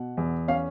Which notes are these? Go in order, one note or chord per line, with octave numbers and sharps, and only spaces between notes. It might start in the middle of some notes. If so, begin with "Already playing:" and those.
Already playing: B2 F#5
E2
C#4 F5